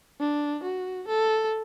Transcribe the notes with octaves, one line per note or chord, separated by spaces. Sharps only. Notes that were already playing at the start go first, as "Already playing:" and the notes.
D4
F#4
A4